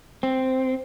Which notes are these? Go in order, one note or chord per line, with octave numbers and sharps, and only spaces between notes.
C4